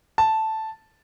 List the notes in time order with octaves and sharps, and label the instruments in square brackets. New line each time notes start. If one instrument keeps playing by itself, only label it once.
[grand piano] A5